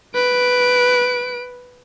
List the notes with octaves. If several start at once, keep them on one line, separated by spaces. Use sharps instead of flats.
B4 D7